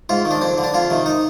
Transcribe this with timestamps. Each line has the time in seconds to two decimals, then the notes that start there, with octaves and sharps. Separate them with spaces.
0.09 G#2 F4
0.25 D#3
0.31 D4
0.41 F2 C4
0.58 D3
0.64 D4
0.74 F2 F4
0.90 C3 D#3
1.06 D#4